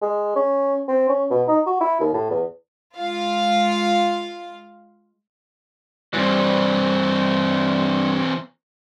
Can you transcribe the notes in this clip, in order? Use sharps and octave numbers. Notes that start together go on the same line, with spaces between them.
G#3
C#4
C4
C#4
B2
D#4
F#4
E4
D#2
A2
E2
G#3 F4 F5
G2 E3 C4